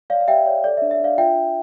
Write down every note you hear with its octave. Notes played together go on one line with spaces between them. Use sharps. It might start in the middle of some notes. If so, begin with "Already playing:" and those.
C#5 D5 F5
F5
G4 E5 G5
C#5 D5
A4 D5
D4 E5
E5
D4 D5 F5
F4 E5 G5
D4